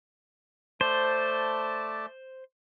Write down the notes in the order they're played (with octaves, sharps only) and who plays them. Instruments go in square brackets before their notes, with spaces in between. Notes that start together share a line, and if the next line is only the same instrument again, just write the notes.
[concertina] A3 D5 A5 [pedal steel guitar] C5